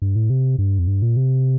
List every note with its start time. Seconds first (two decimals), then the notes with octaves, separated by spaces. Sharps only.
0.02 G2
0.16 A2
0.30 C3
0.58 G2
0.79 F2
0.87 G2
1.02 A#2
1.17 C3